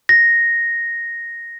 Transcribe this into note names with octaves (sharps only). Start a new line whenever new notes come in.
A#6